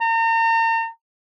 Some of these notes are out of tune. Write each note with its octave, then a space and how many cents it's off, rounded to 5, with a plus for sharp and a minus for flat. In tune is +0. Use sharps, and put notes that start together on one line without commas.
A#5 -40